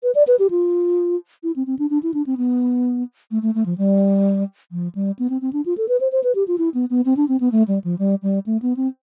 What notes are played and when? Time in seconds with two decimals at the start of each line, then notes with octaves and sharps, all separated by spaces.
0.03 B4
0.15 D5
0.28 B4
0.39 G4
0.50 F4
1.43 E4
1.56 C4
1.67 C4
1.79 D4
1.90 D4
2.03 E4
2.14 D4
2.26 C4
2.37 B3
3.31 A3
3.42 A3
3.55 A3
3.66 F3
3.78 G3
4.72 F3
4.95 G3
5.19 B3
5.30 C4
5.42 C4
5.53 D4
5.66 F4
5.78 A4
5.88 B4
6.00 C5
6.12 C5
6.24 B4
6.35 G4
6.48 F4
6.58 E4
6.74 B3
6.90 B3
7.05 C4
7.17 D4
7.28 C4
7.40 B3
7.52 A3
7.68 G3
7.84 F3
7.99 G3
8.23 G3
8.46 A3
8.62 B3
8.77 C4